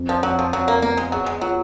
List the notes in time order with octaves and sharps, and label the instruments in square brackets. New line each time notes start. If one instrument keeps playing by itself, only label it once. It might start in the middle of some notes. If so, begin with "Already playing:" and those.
Already playing: [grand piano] F2
[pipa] F3
[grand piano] F2 [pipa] F#3
[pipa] F3
[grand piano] F2 [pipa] F#3
[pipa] A#3
[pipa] A#3 [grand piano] B3
[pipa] G#3
[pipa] F#3 [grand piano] G#4
[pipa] G#3
[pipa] F#3 [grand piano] F4